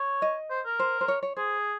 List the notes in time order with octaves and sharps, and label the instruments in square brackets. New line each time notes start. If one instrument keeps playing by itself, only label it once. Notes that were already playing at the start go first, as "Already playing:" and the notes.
Already playing: [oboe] C#5
[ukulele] D#5
[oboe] C5
A#4
[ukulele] C5
C5
C#5
C#5
[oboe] G#4 [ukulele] C5